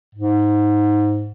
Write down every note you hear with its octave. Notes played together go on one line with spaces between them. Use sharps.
G#2